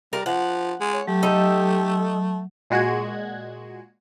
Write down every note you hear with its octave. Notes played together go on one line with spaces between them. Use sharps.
G3 A#4
F3 F#5
G#3
C#5
F#3 A3 G4
D#4 A4
A#2 G#3 F#4 F#6 G#6